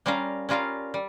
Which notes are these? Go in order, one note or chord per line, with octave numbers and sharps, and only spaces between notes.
G3 C#4 F4 A#4 F5
G3 C#4 F4 A#4 F5
G3